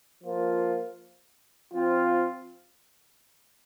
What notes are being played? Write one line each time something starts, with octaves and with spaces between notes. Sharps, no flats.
F3 A#3 F4
F3 C4 F4